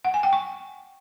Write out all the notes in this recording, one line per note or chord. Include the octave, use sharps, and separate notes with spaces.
F#5
G#5
G5
C#6